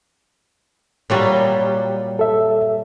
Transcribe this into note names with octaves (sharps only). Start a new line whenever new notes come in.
A#2 F#3 G3
A4 E5